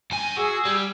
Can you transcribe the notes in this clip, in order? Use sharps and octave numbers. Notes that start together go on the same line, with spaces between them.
G2 G#5
F#4 G#4 E6
G3